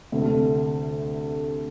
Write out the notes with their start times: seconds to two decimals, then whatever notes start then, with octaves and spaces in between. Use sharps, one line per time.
0.12 D2 C3 A3